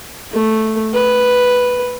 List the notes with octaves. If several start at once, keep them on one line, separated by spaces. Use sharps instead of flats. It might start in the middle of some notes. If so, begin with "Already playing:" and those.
A3
B4